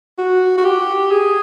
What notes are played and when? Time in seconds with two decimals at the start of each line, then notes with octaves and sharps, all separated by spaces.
0.18 F#4
0.58 F#4
0.65 G4
1.11 G#4